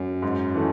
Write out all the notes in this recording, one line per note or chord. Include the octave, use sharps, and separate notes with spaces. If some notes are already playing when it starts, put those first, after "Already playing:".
Already playing: F#2
G#2
E3 A3